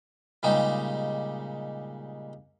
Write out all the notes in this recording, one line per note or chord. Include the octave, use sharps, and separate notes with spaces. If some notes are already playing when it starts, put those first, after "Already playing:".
A#2 C#3 G3 G#3 D#4 G4